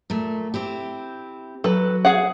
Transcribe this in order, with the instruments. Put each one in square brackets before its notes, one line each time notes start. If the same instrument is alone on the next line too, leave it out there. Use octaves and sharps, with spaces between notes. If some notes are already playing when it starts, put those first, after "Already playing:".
[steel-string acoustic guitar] A#2 A3
C4 E4 G4
[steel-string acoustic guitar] F#3 [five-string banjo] A4 B4
[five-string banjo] G#4 F5 F#5